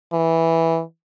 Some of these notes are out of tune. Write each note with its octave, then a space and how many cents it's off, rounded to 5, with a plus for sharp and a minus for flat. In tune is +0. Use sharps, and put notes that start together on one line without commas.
E3 -5